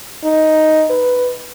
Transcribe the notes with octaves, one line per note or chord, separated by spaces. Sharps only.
D#4
B4